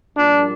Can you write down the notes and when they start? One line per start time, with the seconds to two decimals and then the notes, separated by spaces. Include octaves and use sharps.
0.15 A#1 A#2 G3 D4